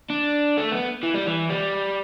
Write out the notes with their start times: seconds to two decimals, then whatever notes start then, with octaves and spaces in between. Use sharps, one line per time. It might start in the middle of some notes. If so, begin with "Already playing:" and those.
0.10 D4
0.58 A3
0.72 B3
1.03 E3
1.14 G3
1.27 E3
1.50 G3